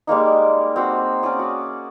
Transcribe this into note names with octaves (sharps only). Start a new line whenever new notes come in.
G3 G#3 A#3 D#4
C4 F#4 C5
C#4 D5 D6 D#6
F#4